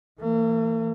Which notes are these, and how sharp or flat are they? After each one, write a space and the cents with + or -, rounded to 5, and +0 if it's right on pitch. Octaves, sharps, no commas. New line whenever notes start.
E3 +0 A#3 -45